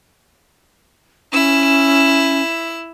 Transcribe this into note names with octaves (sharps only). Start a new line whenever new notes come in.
C#4 E4 E6